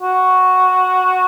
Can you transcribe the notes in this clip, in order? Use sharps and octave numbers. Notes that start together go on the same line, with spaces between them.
F#4